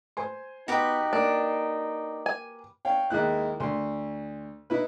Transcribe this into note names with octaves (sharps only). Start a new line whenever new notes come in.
C5 G#5 C6
B3 D#4 F#4 G4 B4
A#3 D4
G#5
C#5 F5 G5
D#2 G#3 E4 F#6
D2 C6
D#4 E4 B4